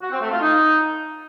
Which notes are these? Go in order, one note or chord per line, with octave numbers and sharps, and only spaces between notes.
F#4
C4
A3
F4
D#4